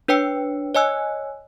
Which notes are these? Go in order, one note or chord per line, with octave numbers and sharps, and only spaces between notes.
D4 B4 C#5 G5 E6 C#7
C#5 D#5 G#5 E6 F#6